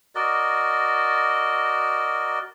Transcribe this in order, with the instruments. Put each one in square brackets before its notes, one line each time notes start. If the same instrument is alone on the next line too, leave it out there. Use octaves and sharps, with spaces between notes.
[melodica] F#4 A#4 D5 D#5